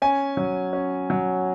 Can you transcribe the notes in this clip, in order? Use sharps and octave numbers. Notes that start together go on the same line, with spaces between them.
C#4 G#5
F#3
C#4
F#3